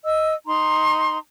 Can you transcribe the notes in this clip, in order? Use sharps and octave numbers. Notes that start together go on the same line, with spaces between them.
D#5 E6
D#4 A#5 C6